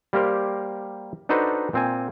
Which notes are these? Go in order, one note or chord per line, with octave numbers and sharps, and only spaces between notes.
G3 A#3 G4 A#4 C5
D4 D#4 F#4 A4 B4 C5
A#2 C4 G#5